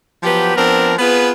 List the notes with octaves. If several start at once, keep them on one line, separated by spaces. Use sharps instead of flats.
F3 F#3 B3 G4
F3 B3 C4 D4 A#4
B3 C4 F4 G#4 B4